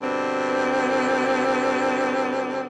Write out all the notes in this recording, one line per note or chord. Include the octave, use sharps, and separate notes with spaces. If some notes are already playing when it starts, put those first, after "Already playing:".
G2 B2 D3 C4